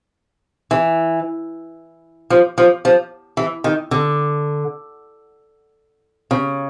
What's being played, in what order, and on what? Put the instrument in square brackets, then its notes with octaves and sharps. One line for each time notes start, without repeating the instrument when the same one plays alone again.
[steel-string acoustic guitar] E3
F3
F3
F3
E3
D#3
D3
C#3